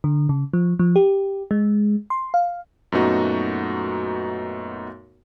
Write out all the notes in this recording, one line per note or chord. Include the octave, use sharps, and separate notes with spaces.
D3
C#3
F3
F3
G4
G#3
C6
F5
F#2 A#2 A3 B3 D#4 F#4